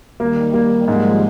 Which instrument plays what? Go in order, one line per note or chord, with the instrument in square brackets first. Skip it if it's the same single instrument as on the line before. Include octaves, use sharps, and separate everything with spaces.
[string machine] D#3 G3 [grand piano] A#3
[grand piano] A#3
[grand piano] G#2 [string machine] F3 G#3